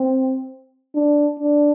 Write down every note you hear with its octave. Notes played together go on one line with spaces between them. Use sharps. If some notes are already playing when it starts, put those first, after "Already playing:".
Already playing: C4
D4
D4